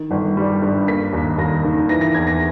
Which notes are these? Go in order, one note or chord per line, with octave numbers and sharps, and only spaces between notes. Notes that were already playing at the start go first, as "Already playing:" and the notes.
Already playing: D#3
G1
G3
G2
A#3 B6
D#2
D#2 A#6
D#3
E3 A#6
A#6
E2 G#6
A#6